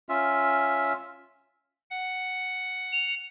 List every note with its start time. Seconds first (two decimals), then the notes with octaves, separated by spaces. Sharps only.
0.09 C#4 F4 E5
1.91 F#5
2.93 F7